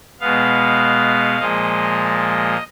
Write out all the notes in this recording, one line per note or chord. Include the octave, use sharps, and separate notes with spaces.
B2 G#3 B3 F5
A#2 F3 G#3 D#5